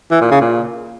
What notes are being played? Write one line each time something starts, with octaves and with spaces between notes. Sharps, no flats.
E3
A#2
C#3
A#2